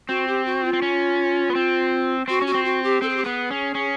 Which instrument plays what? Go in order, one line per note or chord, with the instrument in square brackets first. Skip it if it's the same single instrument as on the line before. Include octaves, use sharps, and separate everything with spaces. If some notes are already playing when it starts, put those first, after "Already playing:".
[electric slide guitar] C4 [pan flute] F#4
[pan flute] G4
F#4
F4
[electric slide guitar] C4
C#4
B3
C4
[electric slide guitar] C4 [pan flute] F#4
[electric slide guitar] C#4 [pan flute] F#4
[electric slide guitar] C4
[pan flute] F#4
G4
[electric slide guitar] C4 [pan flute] A4
[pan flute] G#4
G4
[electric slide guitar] B3 [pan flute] G#4
[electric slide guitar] C#4
C#4